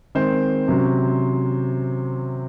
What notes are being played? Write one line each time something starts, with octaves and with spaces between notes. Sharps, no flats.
D#3 G#3 C4 C5
C3 F#3 C#4